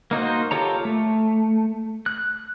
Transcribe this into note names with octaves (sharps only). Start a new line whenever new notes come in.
A#3 D#4 F#4 C5
F4 G4 A4 C#5 A#5
A3
F#6